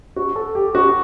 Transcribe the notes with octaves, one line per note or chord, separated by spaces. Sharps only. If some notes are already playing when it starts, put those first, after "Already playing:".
F#4
A4
G4
F#4